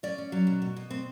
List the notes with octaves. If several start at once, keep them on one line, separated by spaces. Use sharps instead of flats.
C#4 D5
C#4
F#3
B2
B2
B2
C4